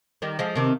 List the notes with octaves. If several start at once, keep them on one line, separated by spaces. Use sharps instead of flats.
D#3 G3
F3 G#3
C3 D#3